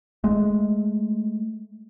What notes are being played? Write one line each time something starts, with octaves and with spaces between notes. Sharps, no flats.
G#3 A3